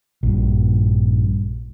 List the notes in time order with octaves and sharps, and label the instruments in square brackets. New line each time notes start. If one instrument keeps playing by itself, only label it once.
[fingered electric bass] A#1 G2